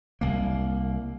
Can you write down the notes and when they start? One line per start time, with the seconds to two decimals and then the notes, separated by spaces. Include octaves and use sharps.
0.21 C2 A#3